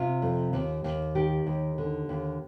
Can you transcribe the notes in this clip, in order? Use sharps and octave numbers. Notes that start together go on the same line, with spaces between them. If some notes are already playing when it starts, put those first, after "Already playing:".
Already playing: C3 F4
F2
D#2
D#2
D#3 G4
D#2
D3
D#2